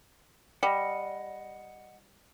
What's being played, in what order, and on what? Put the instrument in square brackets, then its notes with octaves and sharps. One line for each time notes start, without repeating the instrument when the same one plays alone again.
[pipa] G3 [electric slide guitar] D#5 F#5